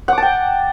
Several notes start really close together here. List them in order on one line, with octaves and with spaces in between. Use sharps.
F#5 D6 A5 G5